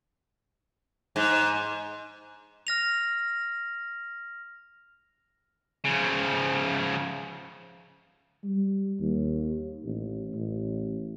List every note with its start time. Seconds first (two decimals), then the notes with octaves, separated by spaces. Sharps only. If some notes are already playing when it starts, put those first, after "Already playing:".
1.16 G#2
2.67 F6 A#6 F7
5.84 C#3 F3
8.44 G3
9.00 D#2
9.83 A1
10.34 A1